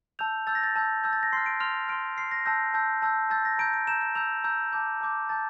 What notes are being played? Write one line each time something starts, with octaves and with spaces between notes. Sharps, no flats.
A5 E6 G6 F7
A5 E6 G6 A6
A#6
A6
A5 E6 G6
A5 E6 G6
A6
A#6
C6 F6 C7
D7
C6 F6 F7
C6 F6 D7
C6 F6 C7
A#6
A5 E6 G6 A#6
A5 E6 G6
A5 E6 G6
A5 E6 G6 A6
A#6
A#5 E6 G6 D7
D7
A#5 E6 G6 E7
E7
A#5 E6 G6 F7
A#5 E6 G6
A5 D6 G6
A5 D6 G6
A5 D6 G6 A6